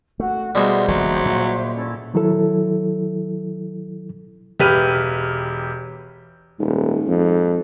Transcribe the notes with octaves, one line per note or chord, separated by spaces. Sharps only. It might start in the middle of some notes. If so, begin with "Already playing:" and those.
A3 F#4
B2 G3 G#3 C5 E5
D#1 A#1 D#3 F#3
A#2
C#4 E4 A4
D#3 F#3 E4 A4
E1 G4 B4 F6 D#7
D#1 G#2
F2